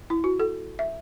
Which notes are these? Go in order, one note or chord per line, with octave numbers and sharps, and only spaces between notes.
E4
F#4
A4
E5